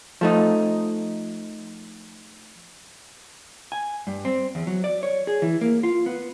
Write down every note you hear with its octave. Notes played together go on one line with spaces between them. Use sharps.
F3 A3 D#4
G#5
G2
C4
E2
F#3
D5
C#5
G#4
E3
A#3
F4
B3